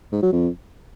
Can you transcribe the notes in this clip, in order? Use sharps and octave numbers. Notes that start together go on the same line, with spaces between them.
G#2
F#3
F2